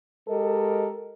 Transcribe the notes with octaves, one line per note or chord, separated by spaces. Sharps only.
G#3 G4 A4 A#4 D#5